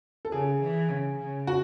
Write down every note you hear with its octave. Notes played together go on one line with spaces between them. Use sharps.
A4
C#3 G#4
E3
C#3
C#3
F#4